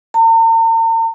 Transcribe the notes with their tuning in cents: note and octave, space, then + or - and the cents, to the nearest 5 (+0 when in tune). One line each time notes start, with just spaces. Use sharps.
A#5 -45